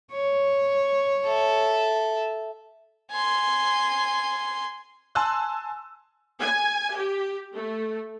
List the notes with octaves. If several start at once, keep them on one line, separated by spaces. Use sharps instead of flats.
C#5
A4 E5
G#5 C6
G#5 A5 C6 E6 F#6
G#5
G4
A3